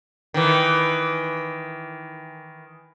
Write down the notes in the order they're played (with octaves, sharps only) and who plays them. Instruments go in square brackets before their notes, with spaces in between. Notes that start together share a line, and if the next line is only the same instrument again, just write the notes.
[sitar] D#3 E3